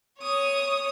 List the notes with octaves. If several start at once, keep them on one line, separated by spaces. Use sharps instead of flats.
C#5 D#6